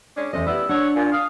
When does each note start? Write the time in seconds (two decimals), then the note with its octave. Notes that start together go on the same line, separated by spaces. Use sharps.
0.16 G#3 C#4 D4 D5
0.33 E2 C3 A3 C#4 C5 D#5
0.47 B3 E4 G4 C5 D5 E6
0.69 D4 C#5 F#5
0.95 A#2 G#5
1.12 F5 D#6